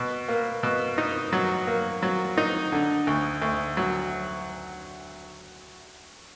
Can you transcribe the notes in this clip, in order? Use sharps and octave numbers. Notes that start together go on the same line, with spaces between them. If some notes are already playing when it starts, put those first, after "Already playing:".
Already playing: B2
A#3
B2
D#4
F#3
A#3
F#3
D#4
D3
D2
D2
F#3